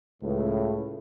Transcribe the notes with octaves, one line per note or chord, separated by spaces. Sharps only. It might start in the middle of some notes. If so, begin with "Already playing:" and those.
C#2 A2